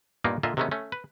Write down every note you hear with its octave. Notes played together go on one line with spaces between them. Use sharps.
G2 A#2 A#3 B3 D#4
A#2 D3 F4 D#5 E5
C3 D#3 G#3 A3 B3 C#4
A3 C#4
B4